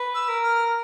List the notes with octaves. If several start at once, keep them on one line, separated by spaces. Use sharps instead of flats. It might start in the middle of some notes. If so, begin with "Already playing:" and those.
Already playing: B4
E6
A#4
F6